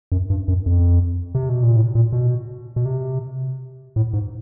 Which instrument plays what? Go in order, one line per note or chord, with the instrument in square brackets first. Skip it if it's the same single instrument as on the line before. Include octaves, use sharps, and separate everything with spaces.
[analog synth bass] F#2
G2
F#2
F2
C3
B2
A#2
A2
A#2
B2
B2
C3
A2
G#2